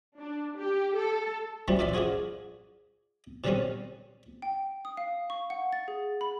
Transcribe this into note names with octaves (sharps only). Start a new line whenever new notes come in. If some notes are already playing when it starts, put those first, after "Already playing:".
D4
G4
A4
F#2 A#2 E3 F3 G3
A#2 E3 D4 D5 E5 C6
D4 F4 F#4 G#4 C5
B2 D3 D#3 G3 C4 C#4
G5
D#6
F5
C#6
F#5
A6
G#4
B5